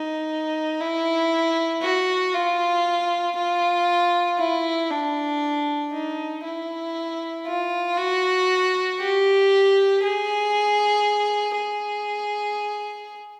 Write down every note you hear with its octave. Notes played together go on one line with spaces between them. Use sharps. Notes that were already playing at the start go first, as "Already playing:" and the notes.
Already playing: D#4
E4
F#4
F4
F4
E4
D4
D#4
E4
F4
F#4
G4
G#4
G#4